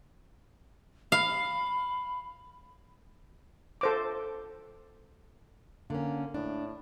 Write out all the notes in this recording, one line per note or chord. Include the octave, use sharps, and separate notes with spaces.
F5 B5
A4 C5 D6
D3 A#3 C#4
A2 D4